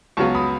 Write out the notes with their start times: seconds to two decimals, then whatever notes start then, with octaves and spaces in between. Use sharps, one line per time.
0.17 C#2 C#3 F#3 B3 A5 C#6
0.35 B5 D#6